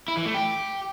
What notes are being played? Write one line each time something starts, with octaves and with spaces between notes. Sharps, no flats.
E4
E3
A3
G4